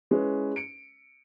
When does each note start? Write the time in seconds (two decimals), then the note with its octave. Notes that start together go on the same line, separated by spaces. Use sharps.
0.11 G#3 C#4 E4 B4
0.56 C#7 D7